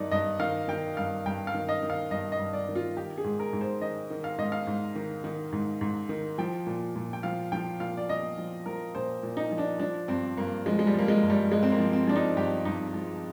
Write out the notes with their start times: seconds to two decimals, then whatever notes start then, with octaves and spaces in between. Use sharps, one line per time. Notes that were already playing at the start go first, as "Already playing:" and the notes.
Already playing: G2 D#3 D#4 D5
0.11 G2 D#5
0.39 D#3 F5
0.68 D#3 G5
0.97 G2 F5
1.26 G2 G5
1.47 F5
1.54 D#3
1.69 D#5
1.83 D#3
1.90 F5
2.11 G2 D#5
2.32 D#5
2.39 G2
2.53 D5
2.69 D#3
2.75 F4
2.97 D#3 G4
3.18 G#4
3.24 G#2
3.39 A#4
3.53 G#2
3.61 C5
3.81 D#3 D#5
4.10 D#3
4.24 F5
4.38 G#2 D#5
4.52 F5
4.67 G#2
4.96 D#3
5.24 D#3
5.52 G#2
5.81 G#2
6.09 D#3
6.38 F3 G5
6.67 A#2
6.96 A#2
7.13 G5
7.23 F3 F5
7.52 F3 G5
7.80 A#2 F5
7.97 D5
8.09 A#2 D#5
8.38 F3
8.66 F3 A#4
8.95 A#2 C5
9.23 A#2
9.37 D#4
9.51 F3
9.58 D4
9.79 F3 D4
10.08 G2 C4
10.37 G2 A#3
10.66 F3 G#3
10.79 G#3
10.87 G3
10.93 F3
10.99 A#3
11.08 G#3
11.23 G2
11.30 G3
11.51 G2 G#3
11.63 C4
11.72 A#3
11.79 F3
11.93 C4
12.07 F3 D4
12.16 D#4
12.37 G2 G4
12.65 G2 D#4
12.94 F3